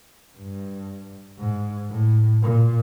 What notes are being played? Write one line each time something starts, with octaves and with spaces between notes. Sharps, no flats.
G2
G#2
A2
A#2